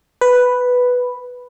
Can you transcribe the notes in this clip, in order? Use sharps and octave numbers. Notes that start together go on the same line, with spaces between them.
B4